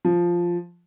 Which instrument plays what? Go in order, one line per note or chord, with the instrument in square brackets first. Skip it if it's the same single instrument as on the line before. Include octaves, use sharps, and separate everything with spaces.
[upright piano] F3